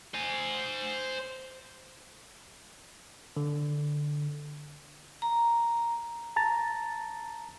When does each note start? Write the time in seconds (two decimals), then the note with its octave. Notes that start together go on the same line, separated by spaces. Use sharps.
0.14 C5 G#5
3.37 D3
5.22 A#5
6.36 A5 A#5 A6